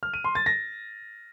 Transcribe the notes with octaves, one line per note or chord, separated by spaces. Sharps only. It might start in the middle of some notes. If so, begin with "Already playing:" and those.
F6
D#7
C6
A6
A#6